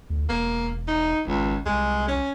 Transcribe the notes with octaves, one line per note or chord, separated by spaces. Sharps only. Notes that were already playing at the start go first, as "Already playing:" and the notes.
D2
E1 A#3
D#4
G#1 C#2
C2 G#3
C#4